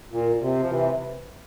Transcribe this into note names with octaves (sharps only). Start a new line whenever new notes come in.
A#2
C3
F3
C3 E3